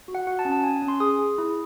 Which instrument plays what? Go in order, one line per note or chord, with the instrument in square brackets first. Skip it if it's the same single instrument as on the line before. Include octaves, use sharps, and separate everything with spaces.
[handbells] F#4
F#5
F#4 F#5
A5
C#4
A5
C#4 G#5
G#5
C#4
C6
G#4 D#6
G#4
E4